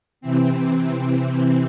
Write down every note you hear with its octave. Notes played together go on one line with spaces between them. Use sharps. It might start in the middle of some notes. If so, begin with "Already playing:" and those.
C3 E3 C4